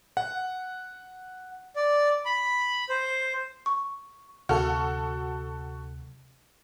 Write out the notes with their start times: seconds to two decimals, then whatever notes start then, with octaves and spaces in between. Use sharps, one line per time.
0.17 F#5
1.76 D5
2.25 B5
2.89 C5
3.66 C#6
4.49 D2 C3 F#4 A4 F6